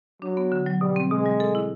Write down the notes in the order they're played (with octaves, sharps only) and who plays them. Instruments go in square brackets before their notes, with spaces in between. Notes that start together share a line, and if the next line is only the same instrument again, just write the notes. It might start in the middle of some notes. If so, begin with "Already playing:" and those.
[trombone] F#3 [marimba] D4
[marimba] B3
D3
F#3
[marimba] B2 [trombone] G3
[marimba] C4
[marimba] B2 [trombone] G#3
[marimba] G3
A4
E4